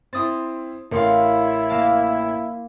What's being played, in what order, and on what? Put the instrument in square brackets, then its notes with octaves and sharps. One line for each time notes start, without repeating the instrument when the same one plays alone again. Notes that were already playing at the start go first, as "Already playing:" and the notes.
[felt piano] C4 E4 [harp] C6 D#6 A6
[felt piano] A1 A#4 [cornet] E4 [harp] F5 C6 C#7
[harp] A#3 F5 A5